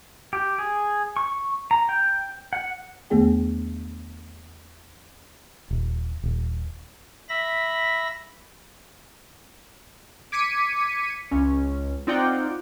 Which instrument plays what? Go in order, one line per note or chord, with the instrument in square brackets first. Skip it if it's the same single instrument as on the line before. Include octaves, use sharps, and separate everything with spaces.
[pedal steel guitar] G4
G#4
C#6
A#5
G5
F#5
[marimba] E2 D#3 A3 B3 G#4 G5
[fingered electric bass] D#1
D#1
[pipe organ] E5 B5 A#6
[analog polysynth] D6 G#6 B6 C#7 D#7
C#2 C#4
C4 D#4 F4 D5 F#5 G5